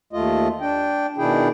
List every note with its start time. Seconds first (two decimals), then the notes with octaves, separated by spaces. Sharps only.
0.13 D#2 A3 F4 D#5
0.61 D4 G5
1.18 B2 D#3 D4 E4 G#4 G5